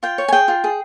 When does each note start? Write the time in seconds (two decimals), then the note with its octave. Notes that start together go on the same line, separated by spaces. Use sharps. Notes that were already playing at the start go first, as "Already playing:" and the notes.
0.03 F4 G5
0.18 C#5
0.28 G#5
0.32 G#4 G5
0.48 F4
0.64 G#4